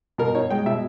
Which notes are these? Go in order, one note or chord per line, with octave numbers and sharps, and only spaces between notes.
B2 A#4
D#4 C#5
G#3 G5
B2 E5